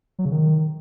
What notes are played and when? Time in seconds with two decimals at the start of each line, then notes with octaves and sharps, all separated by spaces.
0.19 F#3
0.25 C#3
0.31 D#3